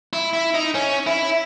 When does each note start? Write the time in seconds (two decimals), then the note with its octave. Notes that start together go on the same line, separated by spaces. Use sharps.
0.13 E4
0.33 E4
0.54 D#4
0.75 C#4
1.07 E4